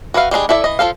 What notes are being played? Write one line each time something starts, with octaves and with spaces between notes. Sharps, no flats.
F#4 B4 E5 F5
G3 G#3 D4 G#4
E4 A4 D5 E5
E3 D#5
F3 C#4 A4 F5